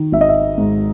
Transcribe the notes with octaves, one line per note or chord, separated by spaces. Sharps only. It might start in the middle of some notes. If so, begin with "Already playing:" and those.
Already playing: D#3
G#1 E5
D#5
E5
G#2